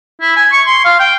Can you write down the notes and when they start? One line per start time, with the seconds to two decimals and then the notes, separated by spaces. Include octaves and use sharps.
0.21 E4
0.36 G#5
0.52 C#6
0.66 C6
0.85 F5
0.99 G5